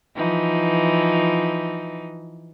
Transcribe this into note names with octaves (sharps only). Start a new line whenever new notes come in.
E3 F3 D#4